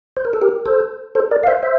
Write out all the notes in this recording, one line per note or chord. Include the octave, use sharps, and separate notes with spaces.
C5
A#4
A4
G4 A#4
A4 C5
A4 C5
A#4 D5
F5
C5 E5
C5 E5